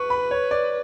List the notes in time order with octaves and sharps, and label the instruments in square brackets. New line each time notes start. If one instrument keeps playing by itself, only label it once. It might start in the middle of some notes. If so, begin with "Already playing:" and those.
Already playing: [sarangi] B4 [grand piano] C#6
[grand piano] B5
C#5
D5